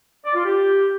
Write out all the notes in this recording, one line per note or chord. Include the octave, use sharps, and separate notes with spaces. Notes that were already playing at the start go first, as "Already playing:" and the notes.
D5
F4
G4